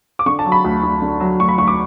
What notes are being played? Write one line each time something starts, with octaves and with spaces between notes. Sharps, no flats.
D6
D3 C#6
A5
F#3
B5
D2
D2
D3
F#3
D2 C#6
B5
D2 C#6
D6